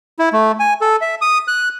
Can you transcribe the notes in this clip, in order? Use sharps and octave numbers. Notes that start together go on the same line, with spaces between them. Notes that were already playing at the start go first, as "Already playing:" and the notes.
E4
A3
G#5
A4
E5
D#6
F#6